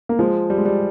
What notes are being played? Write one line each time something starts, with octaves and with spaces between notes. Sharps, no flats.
A#3
F3 G#3
G3
G#3
G3